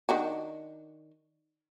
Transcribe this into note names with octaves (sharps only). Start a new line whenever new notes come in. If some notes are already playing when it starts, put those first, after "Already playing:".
D#3 D4 F#4